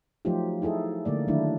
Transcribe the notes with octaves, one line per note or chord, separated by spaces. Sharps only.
F3 F#3 A3 D#4 F4 G4
D#4 E4 G#4 A4
D3 A3 A#3 D5
D#3 F#3 A3 D4 E4